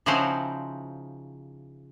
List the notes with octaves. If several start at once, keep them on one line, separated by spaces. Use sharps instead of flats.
C#3 F3 D#4 E4 F#4 C5